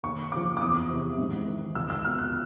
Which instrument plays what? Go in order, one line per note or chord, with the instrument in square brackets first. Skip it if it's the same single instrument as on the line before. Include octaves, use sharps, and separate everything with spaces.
[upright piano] D#2 C#6
C#3 F3 D6
D6
E2 D#6
C3 E3
G#2
D#3
C#2 E6
E6
B2 F6
F#6